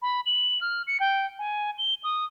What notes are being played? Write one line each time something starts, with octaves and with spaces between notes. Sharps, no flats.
B5
F#7
F6
C#7
G5
G#5
G7
D#6